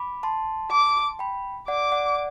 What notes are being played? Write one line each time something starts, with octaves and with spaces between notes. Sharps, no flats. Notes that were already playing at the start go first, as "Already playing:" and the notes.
Already playing: B5 D6
A5 C6
D6
G5 B5
D5 F#5 D6
D5 F#5